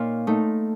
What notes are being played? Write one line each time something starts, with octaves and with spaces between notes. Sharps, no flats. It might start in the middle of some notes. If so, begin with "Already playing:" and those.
Already playing: A#2 D#4 C#5 F5
A3 D#4